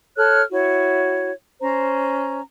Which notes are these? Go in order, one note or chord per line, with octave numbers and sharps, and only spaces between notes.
A4 C#5 F6 F#6
E4 F#4 C#5
C#4 C5 A#5